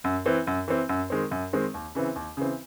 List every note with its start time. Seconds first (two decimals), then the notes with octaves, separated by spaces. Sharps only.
0.04 F#2
0.26 E3 C4
0.47 F#2
0.68 E3 C4
0.89 F#2
1.10 D#3 G#3 C4
1.31 F#2
1.53 D#3 G#3 C4
1.74 D#2
1.95 C#3 E3 C4
2.16 D#2
2.37 C#3 E3 C4